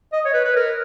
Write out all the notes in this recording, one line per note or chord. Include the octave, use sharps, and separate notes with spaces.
D#5
C#5
B4
B4
A#4